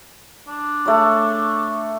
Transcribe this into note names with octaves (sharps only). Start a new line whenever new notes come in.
D4
A3 C#5